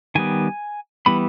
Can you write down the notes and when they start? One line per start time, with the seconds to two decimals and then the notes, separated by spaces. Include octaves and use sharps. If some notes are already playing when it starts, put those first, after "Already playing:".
0.15 D#3 G3 B3 G#5
1.06 E3 G3 B3 B5